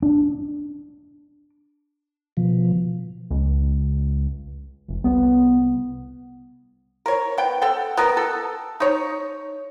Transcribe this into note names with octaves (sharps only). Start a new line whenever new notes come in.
D4
B2 F3
C#2
F1
C2 B3
A#4 C#5
B3 G5
A4 F#5 G5
B3 A#4
A4
D#4 C#5